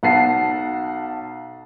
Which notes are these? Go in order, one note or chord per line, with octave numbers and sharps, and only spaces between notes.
B1 F#5 A5 C7